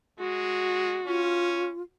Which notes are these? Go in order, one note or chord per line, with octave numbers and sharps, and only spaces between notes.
G#3 F#4
C#4 F4